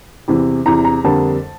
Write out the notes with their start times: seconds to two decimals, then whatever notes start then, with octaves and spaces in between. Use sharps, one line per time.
0.28 E2 C3 E3
0.65 E2 C3 E3 A#5
0.85 A#5
1.04 F2 D3 G3 A#3 A5